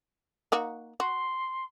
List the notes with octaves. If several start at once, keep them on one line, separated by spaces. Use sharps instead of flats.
A#3 D#4 F#4
F#4 C6